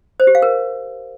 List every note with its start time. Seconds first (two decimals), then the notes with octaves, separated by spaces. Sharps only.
0.20 C5
0.27 G4
0.35 F5
0.42 A#4